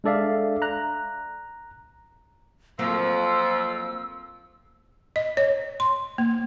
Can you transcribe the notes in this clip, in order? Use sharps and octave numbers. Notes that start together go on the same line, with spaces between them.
G#3 D4 A4 D5 E5 F5
A#5 F#6
F2 F3 F#3 A#3 C4 E6
D#5
C#5
C6
A#3